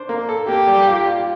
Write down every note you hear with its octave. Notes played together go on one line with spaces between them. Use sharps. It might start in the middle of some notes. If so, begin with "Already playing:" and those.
Already playing: D4 C5
A#3
A4
A#3 G4
G3
F4
F4